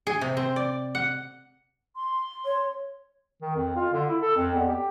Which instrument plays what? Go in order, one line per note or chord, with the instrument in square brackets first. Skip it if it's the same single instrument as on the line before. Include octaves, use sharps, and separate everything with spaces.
[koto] G#4
C3
C4
D5
F#5
[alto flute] C6
[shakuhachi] C#5
[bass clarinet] D#3
F2
F4
D3
E4
A4
F2
E2
G4